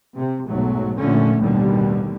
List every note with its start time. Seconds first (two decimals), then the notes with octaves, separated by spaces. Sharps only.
0.15 C3
0.46 B1 G#2 F#3 A3
0.97 F1 A#2 D3 A3 C#4
1.40 A1 D#2 B2 D3 G3